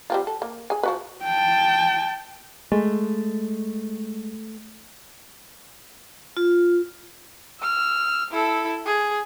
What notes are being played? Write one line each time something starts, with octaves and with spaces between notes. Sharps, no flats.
G3 C4 F4
A4
A#3
G#4 G#5
F3 F#4 B4
G5 A5
G#3 A3
F4
E6 F6
E4 A4
G#4